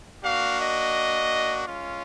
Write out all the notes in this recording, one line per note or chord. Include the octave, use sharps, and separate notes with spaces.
A#3 D4 F#4 F5
D#5
G#3 C#4 F4